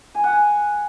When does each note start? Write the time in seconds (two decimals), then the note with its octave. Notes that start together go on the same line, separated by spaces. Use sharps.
0.15 G#5
0.24 F#5
0.33 G#5